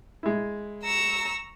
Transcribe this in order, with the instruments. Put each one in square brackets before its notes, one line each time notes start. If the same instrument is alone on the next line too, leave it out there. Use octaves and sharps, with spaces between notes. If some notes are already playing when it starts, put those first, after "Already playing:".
[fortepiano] G#3 E4
[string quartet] A#5 C#6 E6